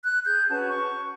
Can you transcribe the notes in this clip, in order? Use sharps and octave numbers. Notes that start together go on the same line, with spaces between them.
F#6
G#4 G6
C#4 F#4 B4 A5
C#6